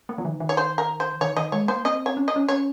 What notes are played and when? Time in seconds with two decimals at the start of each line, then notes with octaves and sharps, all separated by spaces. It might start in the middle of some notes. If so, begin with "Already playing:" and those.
0.09 A#3
0.18 F3
0.25 D#3
0.40 D#3
0.49 C#5
0.57 C5
0.78 A#4
1.00 C5
1.21 D#3 C#5
1.37 D#3 D#5
1.52 G#3 C#5
1.68 A#3 C5
1.85 C4 D#5
2.06 C#5
2.17 C#4
2.28 D#5
2.36 C#4
2.48 C#4 C#5